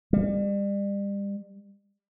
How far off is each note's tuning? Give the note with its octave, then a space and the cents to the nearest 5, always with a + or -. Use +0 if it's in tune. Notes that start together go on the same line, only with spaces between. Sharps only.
G3 +35